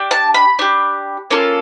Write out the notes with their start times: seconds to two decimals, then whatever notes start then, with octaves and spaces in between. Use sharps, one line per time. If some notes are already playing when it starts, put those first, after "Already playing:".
Already playing: D4 G4
0.11 A5
0.34 B5
0.59 D4 G4
1.31 A#3 C#4 F4 A4